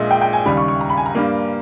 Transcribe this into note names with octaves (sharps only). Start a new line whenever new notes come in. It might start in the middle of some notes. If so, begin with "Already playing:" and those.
Already playing: A#1 A#2 G#3 D#5 E5
G5
G5
G#5
D#2 C#3 G3 B5
C#6
C#6
A#5
B5
G#5
A#5
G2 G3 A#3